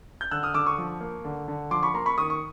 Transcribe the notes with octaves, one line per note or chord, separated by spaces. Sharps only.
G6
D3 E6 F#6
D#6 F6
D3 D6 E6
C#6 D#6
F3
A#3
D3
D3
F3 C6 D6
B5 C#6
A#3 A#5 C6
B5 C#6
D#3 C#6 D#6
C#6